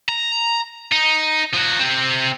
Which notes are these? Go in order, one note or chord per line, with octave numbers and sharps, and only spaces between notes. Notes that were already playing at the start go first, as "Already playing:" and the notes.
A#5
D#4
F3 F#4
C3 C4